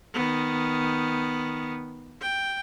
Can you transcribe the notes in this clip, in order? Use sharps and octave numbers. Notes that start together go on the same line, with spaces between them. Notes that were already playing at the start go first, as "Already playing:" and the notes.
D#3 B3
G5